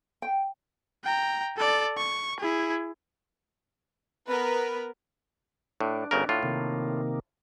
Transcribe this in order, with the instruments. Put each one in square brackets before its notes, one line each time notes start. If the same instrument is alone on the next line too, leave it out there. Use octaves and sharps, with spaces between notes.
[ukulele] G5
[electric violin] G5 A#5
A4 D5
C#6
E4 G#4
[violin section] B3 A#4 B4
[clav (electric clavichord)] A2 [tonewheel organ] D4
[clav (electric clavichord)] G1 C#3 A#4
A2 F4
[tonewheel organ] C3 D#3 A#3